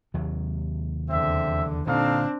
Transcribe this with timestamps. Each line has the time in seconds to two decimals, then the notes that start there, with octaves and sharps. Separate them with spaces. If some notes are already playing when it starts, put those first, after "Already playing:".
0.14 D#2 C3 F#3
1.10 E2 D3 C4 E5
1.87 A#2 D3 C4 D4 D#4 A4 F5